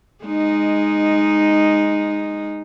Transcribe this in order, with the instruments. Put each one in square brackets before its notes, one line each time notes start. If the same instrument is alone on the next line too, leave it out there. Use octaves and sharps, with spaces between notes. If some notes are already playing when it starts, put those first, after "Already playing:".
[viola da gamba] G#3 D#4